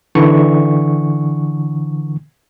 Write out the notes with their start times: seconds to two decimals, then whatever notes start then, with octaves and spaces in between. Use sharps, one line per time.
0.15 D3 E3 C#6